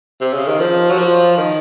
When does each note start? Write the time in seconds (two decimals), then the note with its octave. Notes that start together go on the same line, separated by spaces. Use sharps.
0.21 C3
0.34 C#3
0.47 D#3
0.60 F3
0.91 F#3
0.98 F3
1.37 D#3